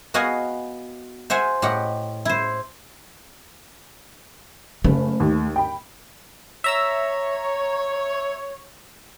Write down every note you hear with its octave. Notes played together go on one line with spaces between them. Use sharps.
B3 F#4 D#5 F5 F#5 G#5
C5 E5 F#5 G#5
A2 G4 D#5 F#5
E4 C5
F#1 C#3 A3
D#2 D#3
G5 B5
C#5 E5 A#5 E6